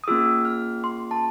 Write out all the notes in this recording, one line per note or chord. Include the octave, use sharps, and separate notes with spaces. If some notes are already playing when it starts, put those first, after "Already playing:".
D#6
A#3 C#4 F4 G#4 E6
F6
C6
A5